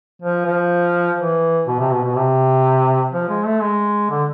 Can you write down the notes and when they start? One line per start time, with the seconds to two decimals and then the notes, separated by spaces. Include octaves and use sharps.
0.22 F3
0.46 F3
1.19 E3
1.67 B2
1.79 C3
1.91 B2
2.04 B2
2.15 C3
3.13 F3
3.29 G#3
3.45 A3
3.62 G#3
4.10 D3